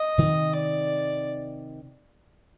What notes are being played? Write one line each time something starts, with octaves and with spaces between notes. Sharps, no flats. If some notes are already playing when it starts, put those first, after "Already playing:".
Already playing: D#5
C3 D#3
D5